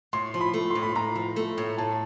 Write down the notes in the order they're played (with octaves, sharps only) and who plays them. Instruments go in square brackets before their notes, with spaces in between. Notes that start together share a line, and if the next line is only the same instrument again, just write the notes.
[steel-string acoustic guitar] A2 [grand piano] C6
[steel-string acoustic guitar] F3
[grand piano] B5
[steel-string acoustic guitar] A3
[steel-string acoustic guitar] A2 [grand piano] C6
[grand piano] B5
[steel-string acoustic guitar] A2 [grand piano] A#5
[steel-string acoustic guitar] F3
A3
A2
[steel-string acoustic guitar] A2 [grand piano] A5